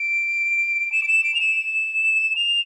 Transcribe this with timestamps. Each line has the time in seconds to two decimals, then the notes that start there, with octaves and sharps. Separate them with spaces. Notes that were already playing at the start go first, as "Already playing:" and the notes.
Already playing: D7
0.92 E7
1.03 D7
1.08 E7
1.24 D7
1.34 F7
1.40 E7
2.36 F7